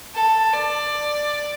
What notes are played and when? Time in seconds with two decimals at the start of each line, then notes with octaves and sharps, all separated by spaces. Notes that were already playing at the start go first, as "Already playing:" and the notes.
0.15 A4
0.53 D5